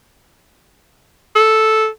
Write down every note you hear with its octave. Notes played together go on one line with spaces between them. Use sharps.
A4